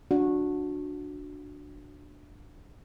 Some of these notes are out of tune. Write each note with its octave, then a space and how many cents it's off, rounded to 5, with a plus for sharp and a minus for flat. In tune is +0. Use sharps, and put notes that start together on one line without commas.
D4 +0 F#4 -20